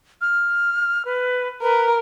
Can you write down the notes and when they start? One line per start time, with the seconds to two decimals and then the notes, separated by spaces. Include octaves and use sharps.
0.21 F6
1.05 B4
1.62 A#4 B4